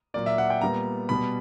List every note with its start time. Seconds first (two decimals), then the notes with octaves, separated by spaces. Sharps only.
0.14 A#2 F#3 A#3 D5
0.26 E5
0.38 F#5
0.50 G5
0.61 A#2 G3 B3 A#5
1.09 B2 G3 B3 B5